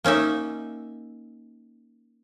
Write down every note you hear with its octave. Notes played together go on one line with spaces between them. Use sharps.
A#3 C#4 D#4 E5